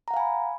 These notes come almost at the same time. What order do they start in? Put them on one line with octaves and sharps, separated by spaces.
A#5 F#5 F5 G#5 B5